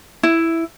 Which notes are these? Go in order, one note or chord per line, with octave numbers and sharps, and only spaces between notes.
E4